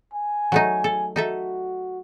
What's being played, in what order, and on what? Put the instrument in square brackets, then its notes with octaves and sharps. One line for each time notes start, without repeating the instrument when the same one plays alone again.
[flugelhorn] G#5
[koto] F#3 A3 D#4
A4
[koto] D#4 A4 E5 [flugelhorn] F#4